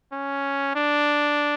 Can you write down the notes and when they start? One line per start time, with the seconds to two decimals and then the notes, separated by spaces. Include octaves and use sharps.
0.13 C#4
0.76 D4